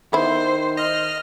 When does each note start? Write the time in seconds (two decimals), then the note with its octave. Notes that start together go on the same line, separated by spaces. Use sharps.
0.13 D#3 B3 E4 C5
0.77 D#5 F6